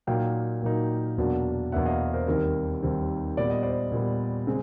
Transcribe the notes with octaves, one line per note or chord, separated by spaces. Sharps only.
A#2 F#3 A#3 D#4 F5 G5
A#2 F#3 A#3 D#4
E2 B2 F#3 A#3 D4
E2 B2 F#3 A#3 D4 E5 F#5
D#5 F5
A#4 C5
D#2 D#3 G3 C4 A#4 C5
D#2 D#3 G3 C4
A#2 G3 B3 D5
D#5
C5 D5
A#2 G3 B3
C#3 G#3 C4